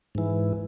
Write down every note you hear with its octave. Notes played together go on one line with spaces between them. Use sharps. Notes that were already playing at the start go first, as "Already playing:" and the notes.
G#2 E3